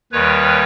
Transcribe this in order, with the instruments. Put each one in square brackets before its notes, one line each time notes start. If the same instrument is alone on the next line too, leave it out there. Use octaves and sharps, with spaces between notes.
[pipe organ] D#2 D#3 G3 B4 C#5